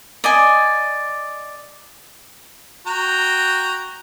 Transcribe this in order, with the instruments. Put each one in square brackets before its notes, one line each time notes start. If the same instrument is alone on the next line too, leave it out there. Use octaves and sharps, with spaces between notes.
[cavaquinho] D5 D#5 G#5
[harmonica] F#4 G5 A#5